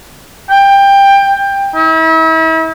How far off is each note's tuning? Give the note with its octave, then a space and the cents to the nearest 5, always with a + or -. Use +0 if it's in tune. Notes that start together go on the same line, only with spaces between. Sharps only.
G5 +20
E4 -40